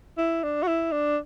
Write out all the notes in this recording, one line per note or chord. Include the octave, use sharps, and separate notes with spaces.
E4
D4
F#4
E4
D4